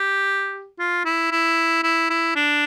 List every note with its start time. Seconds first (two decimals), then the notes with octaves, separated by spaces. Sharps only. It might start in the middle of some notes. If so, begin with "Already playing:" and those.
Already playing: G4
0.79 F4
1.05 E4
1.31 E4
1.83 E4
2.10 E4
2.36 D4